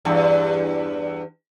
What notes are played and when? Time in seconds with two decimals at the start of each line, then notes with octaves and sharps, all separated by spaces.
0.05 E2 G2